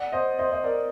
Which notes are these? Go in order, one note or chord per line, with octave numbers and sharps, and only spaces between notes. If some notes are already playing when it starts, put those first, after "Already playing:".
Already playing: D5 F#5
C5 D#5
C5 D#5
C5 D#5
A#4 D5